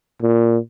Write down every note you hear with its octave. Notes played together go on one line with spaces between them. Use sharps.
A#2